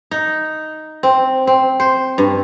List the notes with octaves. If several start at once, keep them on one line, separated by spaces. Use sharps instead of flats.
D#4
C4
C4
C5
G2